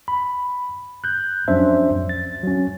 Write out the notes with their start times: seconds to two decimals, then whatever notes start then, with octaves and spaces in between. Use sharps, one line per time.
0.08 B5
1.04 F#6 G6
1.48 F2 F#3 C#4 D4 C5 E5
2.09 A6
2.43 F#3 C#4